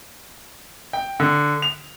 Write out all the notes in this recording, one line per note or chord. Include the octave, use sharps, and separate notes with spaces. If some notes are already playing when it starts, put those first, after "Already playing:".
G5
D3
F7